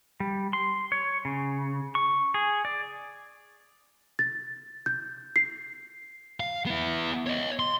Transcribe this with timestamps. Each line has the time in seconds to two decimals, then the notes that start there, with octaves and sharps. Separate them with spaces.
0.20 G3
0.53 C6
0.92 C#5
1.25 C#3
1.95 C#6
2.34 G#4
2.65 D5
4.19 A6
4.86 G6
5.36 C7
6.40 F5
6.66 B3 E4
7.27 C#5 D#5
7.59 C6